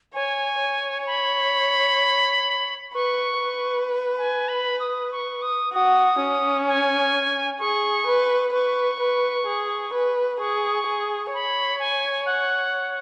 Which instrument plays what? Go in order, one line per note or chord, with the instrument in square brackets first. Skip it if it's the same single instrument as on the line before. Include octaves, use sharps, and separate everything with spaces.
[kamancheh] C#5 [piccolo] G#5
[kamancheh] C#5
[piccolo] B5
[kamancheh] B4 [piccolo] C#6
[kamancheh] B4
[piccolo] B5
G#5
B5
D#6
C#6
D#6
[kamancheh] F#4 [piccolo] D#6
[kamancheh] C#4
[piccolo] G#5
[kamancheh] G#4 [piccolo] C#6
[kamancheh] B4
[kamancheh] B4 [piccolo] C#6
[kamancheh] B4
G#4
B4
[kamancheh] G#4 [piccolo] C#6
[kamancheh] G#4
[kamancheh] C#5 [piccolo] B5
[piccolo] G#5
F#5